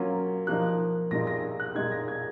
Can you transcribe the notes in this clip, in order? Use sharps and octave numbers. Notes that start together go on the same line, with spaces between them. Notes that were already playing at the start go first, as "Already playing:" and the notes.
Already playing: F#3 A#3 C#4 F4
F3 A#3 D#4 F#6
A#2 G#3 D#4 A#6
A#6
F#6
A#2 G#3 D#4 G#6
A#6
G#6